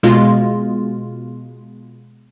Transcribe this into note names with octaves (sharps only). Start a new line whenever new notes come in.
B2 G#3 F4